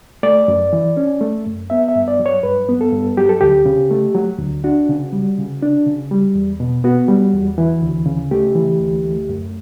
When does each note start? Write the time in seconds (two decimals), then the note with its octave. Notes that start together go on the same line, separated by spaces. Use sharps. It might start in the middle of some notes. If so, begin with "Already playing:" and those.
0.23 A3 D5
0.48 F#2
0.73 E3
0.97 C#4
1.21 A3
1.46 F#2
1.70 B3 E5
1.89 E5
1.96 G2
2.08 D5
2.19 F#3
2.26 C#5
2.43 G2 B4
2.69 B3
2.81 A4
2.92 G2
3.17 F#3 G4
3.29 A4
3.41 D2 G4
3.66 C#3
3.91 A3
4.14 F#3
4.39 D2
4.64 D4 F#4
4.89 C#3
5.13 G3
5.38 C#3
5.62 D4
5.87 C#3
6.11 G3
6.35 E2
6.60 B2
6.84 B3 F#4
7.08 G3
7.33 E2
7.58 E3
7.82 D2
8.06 C#3
8.31 A3 G4
8.55 E3
8.80 D2
9.04 A3
9.29 F#2